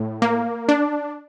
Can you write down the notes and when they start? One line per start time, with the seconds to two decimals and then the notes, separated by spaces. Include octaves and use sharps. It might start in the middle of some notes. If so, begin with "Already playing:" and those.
Already playing: A2
0.22 A#3
0.69 D4